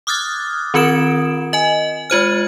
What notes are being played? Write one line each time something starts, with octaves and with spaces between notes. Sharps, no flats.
D6 D#6 F6 F#6 G#6 A6
D#3 C4 F4 A#4 D7 E7
D#5 G#5
G#3 F4 C5 F6